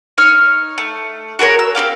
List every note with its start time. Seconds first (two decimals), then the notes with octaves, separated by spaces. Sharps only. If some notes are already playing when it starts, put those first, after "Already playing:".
0.18 D#4 C#5 F6
0.78 A3
1.39 F#4 G#4 A#4 C#5
1.59 E6
1.75 C4 E4 G4 F5